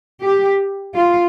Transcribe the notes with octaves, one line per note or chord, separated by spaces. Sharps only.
G4
F4